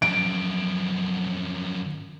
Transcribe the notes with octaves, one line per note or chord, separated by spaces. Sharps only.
F#2 F3 D7